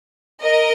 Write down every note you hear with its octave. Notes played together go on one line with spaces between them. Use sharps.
A#4 D#5